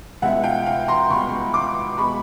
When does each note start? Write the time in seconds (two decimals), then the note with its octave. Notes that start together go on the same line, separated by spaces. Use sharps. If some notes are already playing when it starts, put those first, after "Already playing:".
0.22 C#2 B2 G#3 E5 F#5
0.44 F5 G5
0.66 F5 G5
0.88 A#5 C6
1.10 C#2 B2 G#3 B5 C#6
1.54 C6 D6
1.98 B2 G#3 B5 C#6